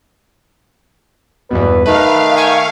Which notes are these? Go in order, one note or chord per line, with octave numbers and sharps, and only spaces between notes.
E2 G2 B2 B4
D#3 A3 D#4 B4 F5
G5 G#5 C#6